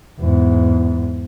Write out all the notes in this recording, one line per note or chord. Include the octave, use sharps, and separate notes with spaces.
E2 G#2